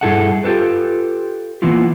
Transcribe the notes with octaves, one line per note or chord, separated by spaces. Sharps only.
G2 E4 G#4 A4 E5 F#5
F4 G4 A4 B4
E3 A#3 B3 E4 F4